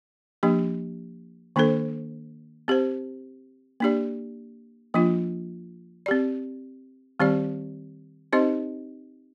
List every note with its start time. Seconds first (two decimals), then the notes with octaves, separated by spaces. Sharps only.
0.43 F3 A#3 D4 G4
1.56 D#3 A#3 D4 A4 C5
2.68 C4 G4 C5
3.80 A#3 D4 G4 D5
4.94 F3 A#3 D4 F4
6.06 C4 G4 D5
7.20 D#3 G3 C4 G4 D5
8.33 C4 D#4 G4 C5 D#5